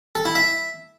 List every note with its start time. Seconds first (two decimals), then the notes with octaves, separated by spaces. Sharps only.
0.15 A4
0.25 E4
0.35 E5